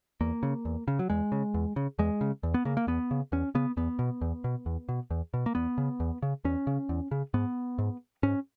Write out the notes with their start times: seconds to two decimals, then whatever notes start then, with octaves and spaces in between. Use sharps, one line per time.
0.21 E2 A#3
0.43 C#3
0.65 E2
0.88 C#3
0.99 F#3
1.10 E2 G#3
1.32 C#3
1.54 E2
1.76 C#3
1.99 E2 G#3
2.21 C#3
2.43 E2
2.54 B3
2.65 C#3 A#3
2.77 A#3
2.87 E2 B3
3.11 C#3
3.32 E2 C#4
3.55 C#3 B3
3.77 E2 B3
3.99 B2
4.21 E2
4.44 B2
4.66 E2
4.89 B2
5.11 E2
5.34 B2
5.46 A#3
5.55 E2 B3
5.78 C#3
6.00 E2
6.22 C#3
6.45 E2 C#4
6.67 C#3
6.89 E2
7.11 C#3
7.34 G#2 B3
7.78 G#2
8.23 G#2 C#4